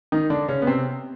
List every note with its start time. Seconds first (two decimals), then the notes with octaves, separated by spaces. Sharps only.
0.12 D#3 D#4
0.30 D3 D4
0.48 C#3 C#4
0.62 B3
0.67 C3 C4